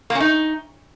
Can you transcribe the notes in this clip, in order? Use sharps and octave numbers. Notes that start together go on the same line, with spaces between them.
A#3
C#4
D#4